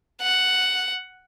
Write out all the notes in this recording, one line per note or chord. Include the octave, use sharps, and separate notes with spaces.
F#5